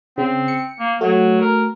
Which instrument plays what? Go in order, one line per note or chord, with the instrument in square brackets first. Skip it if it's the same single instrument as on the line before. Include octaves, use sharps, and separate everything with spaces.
[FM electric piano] C#3 [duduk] C4
[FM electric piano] C#7
[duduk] A#3
[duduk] F#3 [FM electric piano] A3 F#4
[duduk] A#4